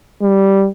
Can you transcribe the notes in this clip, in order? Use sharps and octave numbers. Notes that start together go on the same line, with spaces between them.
G3